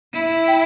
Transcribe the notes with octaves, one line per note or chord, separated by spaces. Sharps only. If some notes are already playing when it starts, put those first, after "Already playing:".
E4
G5